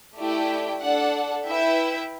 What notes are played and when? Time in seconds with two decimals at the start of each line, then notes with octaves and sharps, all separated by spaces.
0.18 A3 E4 G4 D5 G5
0.81 D4 A4 D5 F#5
1.45 E4 B4 E5 G5